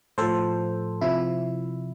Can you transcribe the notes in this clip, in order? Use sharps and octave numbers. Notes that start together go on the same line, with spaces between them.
A2 F3 A4 C5
C3 F3 E4